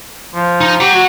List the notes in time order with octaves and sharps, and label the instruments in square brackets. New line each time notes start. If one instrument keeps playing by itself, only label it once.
[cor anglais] F3
[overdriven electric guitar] D#4
[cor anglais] G4 [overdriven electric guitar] F#5 A#5
[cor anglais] F#4